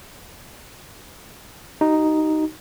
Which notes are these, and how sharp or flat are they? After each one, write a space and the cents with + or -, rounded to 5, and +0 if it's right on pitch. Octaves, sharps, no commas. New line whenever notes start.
D#4 +0 F#4 +45